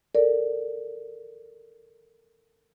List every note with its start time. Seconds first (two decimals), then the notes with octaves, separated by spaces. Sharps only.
0.15 A4 A#4 D5